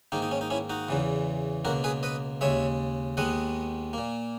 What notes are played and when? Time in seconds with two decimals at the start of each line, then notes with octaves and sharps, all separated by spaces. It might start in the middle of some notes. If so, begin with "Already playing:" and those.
0.12 G#2 D#3 A#3 D#4
0.22 D#4
0.31 C#4
0.41 D#4
0.50 C#4 E4
0.70 D#4 F#4
0.89 E2 C#3 E3
1.65 C#2 B2 A#3 F#4 A#4
1.84 G#4 B4
2.03 B4 D#5
2.41 D#2 C#3 G#3 C#5 E5
3.17 D#2 D#3 G#3 B3 D#5 F#5
3.93 A#2 A#3